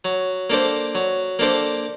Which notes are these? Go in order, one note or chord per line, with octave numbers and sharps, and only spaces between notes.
F#3
A#3 D4 A4 C5
F#3
A#3 D4 A4 C5